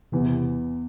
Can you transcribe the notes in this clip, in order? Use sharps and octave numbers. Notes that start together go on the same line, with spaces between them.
E2 C3 E3
C3